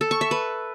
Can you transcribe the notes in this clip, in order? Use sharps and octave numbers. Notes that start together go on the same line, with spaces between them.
A4
C#6
E5
B4